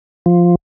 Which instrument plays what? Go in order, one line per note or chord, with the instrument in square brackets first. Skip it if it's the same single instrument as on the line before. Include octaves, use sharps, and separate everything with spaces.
[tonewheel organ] F3